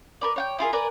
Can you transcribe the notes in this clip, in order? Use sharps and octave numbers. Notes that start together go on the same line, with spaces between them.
A#4 B4 D5
C#5 F#5 G5
E4 F4 G#4 A#4
A#4 B4 D5 G#5